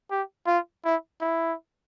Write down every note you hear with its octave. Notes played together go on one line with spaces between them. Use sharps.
G4
F4
E4
E4